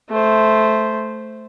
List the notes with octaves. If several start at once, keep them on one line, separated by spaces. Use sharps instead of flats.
A3 C5